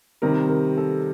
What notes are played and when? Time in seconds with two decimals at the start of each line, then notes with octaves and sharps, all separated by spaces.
0.22 C3 D#3 G3 A#4
0.49 A#4
0.78 A4